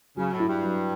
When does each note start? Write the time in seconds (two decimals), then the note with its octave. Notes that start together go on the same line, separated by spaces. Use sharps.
0.17 C#3 F#3
0.33 A2
0.40 E4
0.48 G2
0.63 F#3